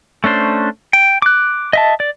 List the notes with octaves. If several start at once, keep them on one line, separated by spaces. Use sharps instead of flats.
A3 C#4 D4 C5
G5
D6 F#6
D#5 E5 A5
D5